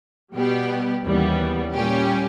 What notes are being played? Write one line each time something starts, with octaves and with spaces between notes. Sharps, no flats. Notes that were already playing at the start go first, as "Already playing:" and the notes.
B2 G3 B3 G4
D#2 C#3 E3 G3 B3
A#2 G3 C#4 G4